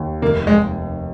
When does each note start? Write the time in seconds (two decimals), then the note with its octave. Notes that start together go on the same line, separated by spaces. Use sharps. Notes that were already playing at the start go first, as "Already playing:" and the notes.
Already playing: D#2
0.22 F1 A#3
0.47 G#3